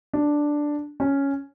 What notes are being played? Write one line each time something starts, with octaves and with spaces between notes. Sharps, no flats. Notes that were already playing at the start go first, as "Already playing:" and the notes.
D4
C#4